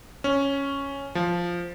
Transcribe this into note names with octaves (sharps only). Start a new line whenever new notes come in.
C#4
F3